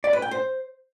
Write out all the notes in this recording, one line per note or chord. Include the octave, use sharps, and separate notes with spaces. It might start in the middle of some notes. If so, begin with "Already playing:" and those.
D5
B4
G5
C5